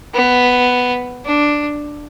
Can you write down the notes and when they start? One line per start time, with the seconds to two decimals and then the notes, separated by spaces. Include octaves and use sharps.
0.14 B3
1.25 D4